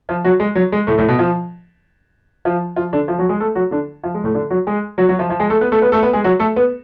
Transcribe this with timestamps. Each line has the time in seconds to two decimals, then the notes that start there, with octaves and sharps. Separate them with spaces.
0.09 F3 F4
0.24 F#3 F#4
0.40 G#3
0.55 F#3
0.72 G#3
0.87 A2 A3
0.98 A2 A3
1.08 B2 B3
1.19 F3 F4
2.45 F3 F4
2.76 F3 F4
2.93 D3 D4
3.08 F3 F4
3.19 F#3 F#4
3.29 G#3 G#4
3.40 A3 A4
3.55 F#3 F#4
3.71 D3 D4
4.03 F3 F4
4.14 G#3
4.24 A2 A3
4.34 D3 D4
4.50 F#3 F#4
4.67 G#3 G#4
4.98 F#3 F#4
5.09 F#3 F#4
5.19 F3 F4
5.29 F3 F4
5.40 G#3 G#4
5.50 A3 A4
5.61 B3 B4
5.72 A3 A4
5.82 B3 B4
5.92 A3 A4
6.03 B3 B4
6.13 G#3 G#4
6.24 F#3 F#4
6.40 A3 A4
6.56 B3 B4